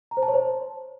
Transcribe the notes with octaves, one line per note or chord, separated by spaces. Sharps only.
A#5
C5
A5
C#5
C5